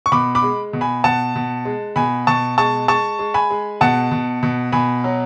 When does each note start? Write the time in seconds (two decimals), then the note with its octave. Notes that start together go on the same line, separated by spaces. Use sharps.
0.06 C#6
0.12 B2 B5 D6
0.35 B5 D6
0.43 G#3
0.73 B2
0.81 G#5 B5
1.04 B2 F#5 A5
1.35 B2
1.65 G#3
1.96 B2 G#5 B5
2.27 B2 A5 C#6
2.58 G#3 A5 C#6
2.88 G#3 A5 C#6
3.19 G#3
3.34 G#5 B5
3.50 G#3
3.81 B2 F#5 A5
4.11 B2
4.43 B2
4.72 B2 G#5 B5
5.04 F#3